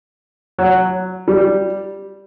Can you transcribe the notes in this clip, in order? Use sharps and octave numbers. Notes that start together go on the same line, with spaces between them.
F#3
G3